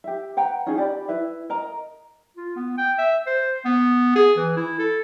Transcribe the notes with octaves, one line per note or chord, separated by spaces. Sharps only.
G4 E5
B4 F#5 G5 A#5
C#4 D#4 F4 G#4
G4 D5 B5
E4 B4 E5
A#4 D#5 A#5
F4
B3
G5
E5
C5
B3
G#4
E3
E4
A4